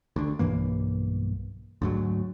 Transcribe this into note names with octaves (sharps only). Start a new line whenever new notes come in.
D2 D3
B1 G2 E3 A#3
D2 G#2 F#3